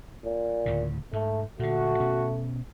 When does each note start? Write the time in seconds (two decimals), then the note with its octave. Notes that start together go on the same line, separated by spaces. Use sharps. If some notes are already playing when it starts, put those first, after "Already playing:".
0.24 A#2
0.66 D2 A2 C#3
1.13 G#2 A3
1.59 A#2 D3 A3 F#4
2.00 B2 C#4